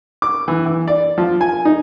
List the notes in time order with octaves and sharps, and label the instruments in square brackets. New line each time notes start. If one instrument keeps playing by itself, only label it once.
[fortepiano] D6
E3
E3
D5
F3
G#5
D#4